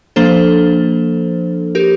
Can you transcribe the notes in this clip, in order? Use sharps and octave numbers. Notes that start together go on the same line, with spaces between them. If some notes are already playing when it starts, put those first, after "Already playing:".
F3 A#3 D4 A4 C5
G4 A#4